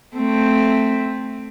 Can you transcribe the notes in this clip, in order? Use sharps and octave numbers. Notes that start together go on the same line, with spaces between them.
A3 C4